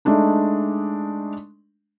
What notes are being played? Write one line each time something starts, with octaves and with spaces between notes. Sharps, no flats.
G#3 A3 D4 D#4